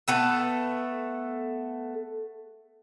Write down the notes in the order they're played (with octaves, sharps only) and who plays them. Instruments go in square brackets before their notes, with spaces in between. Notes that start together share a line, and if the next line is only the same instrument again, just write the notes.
[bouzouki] A3 B3 A4